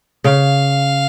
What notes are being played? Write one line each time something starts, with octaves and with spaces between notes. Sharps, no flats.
C#3 F5